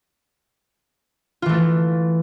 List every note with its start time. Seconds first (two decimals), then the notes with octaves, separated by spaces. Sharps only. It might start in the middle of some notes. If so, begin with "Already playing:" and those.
1.42 F4
1.46 E3
1.49 A3